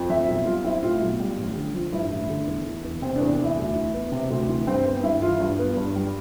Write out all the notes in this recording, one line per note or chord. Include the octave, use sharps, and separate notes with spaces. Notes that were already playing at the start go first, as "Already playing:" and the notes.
Already playing: F2
F3 E5
B1
G3 F4
C4 E4
A2 F4
B1
G3
A1
D3
F3
G2 E4
A1
D3
E2
E3
E2
C3 C4
D4
E2
D4
E3 E4
D2
E3
B3
C3
D2
E3
G2 C4
B3
G2 E4
E3 F4
G2
B3
G2
G3